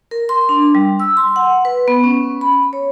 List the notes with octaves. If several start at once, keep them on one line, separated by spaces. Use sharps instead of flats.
A#4
C6
D4
G3
E6
C6
F#5
B4
B3
C#4
B5
C#5